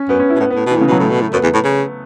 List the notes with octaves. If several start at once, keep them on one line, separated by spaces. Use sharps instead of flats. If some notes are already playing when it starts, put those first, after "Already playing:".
Already playing: C#4
F#2 B3
C#4
E4
B2
A2 B3
B3
A2
B2 E3
A2 C#3
B2 F#3
A2 A3
B2
A2
F#2 B3
E2
A2
C#3